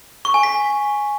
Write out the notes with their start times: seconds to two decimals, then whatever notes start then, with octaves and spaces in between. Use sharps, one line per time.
0.25 C#6
0.34 G#5
0.43 B6